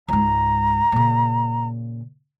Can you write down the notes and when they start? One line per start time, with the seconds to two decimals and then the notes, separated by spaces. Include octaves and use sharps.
0.08 C#2 G#2 A#5
0.92 A#2 C#3